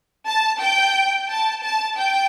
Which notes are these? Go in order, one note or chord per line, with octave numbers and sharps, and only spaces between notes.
A5
G5
A5
A5
G5